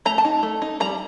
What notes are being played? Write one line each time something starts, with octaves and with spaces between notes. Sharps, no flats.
A3 A#5
A5
D#4
A3
D#4
G3 A#5